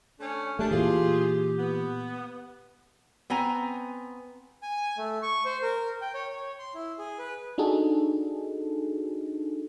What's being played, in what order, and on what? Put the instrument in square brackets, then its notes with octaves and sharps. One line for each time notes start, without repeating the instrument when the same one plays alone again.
[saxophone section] A3 C#4 D4
[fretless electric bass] A3 [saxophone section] D4 [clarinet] G4
[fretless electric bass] A#2 E3 [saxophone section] F4 G#4
[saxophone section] B3
[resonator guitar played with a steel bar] B3 C4 G#5 A#5
[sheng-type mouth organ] G#5
A3
C#6
C5
A#4
G5
C#5
C#5
C6
E4
G#4
B4
[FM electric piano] D4 D#4 F#4 G#4 A4